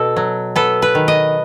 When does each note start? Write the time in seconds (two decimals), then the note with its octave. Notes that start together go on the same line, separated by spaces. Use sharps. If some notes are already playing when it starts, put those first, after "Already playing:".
Already playing: B2 A4
0.16 F#3
0.56 B3 A4
0.82 B4
0.95 D#3
1.08 D#5